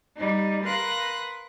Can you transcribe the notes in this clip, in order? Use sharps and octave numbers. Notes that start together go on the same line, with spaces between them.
G3 D#4
A#4 B4 F5 C6 F#6 A#6